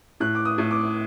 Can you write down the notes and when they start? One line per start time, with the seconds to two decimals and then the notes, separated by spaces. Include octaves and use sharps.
0.20 A2 F#6
0.35 D6
0.45 D#6
0.58 A2
0.71 D6